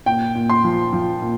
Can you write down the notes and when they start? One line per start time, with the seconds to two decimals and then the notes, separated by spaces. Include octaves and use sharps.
0.06 A#2 G5
0.35 A#2
0.49 C6
0.64 F3
0.93 F3
1.22 A#2